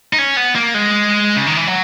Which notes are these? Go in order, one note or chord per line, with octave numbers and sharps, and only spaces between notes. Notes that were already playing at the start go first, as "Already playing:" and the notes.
D#4
C#4
B3
A#3
G#3
C#3
D#3
E3
F#3